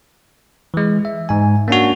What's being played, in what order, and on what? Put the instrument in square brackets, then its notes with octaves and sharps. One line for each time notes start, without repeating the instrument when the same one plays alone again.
[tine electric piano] E3 G#3
E5
G#2 G#5
A#3 C#4 D4 F#4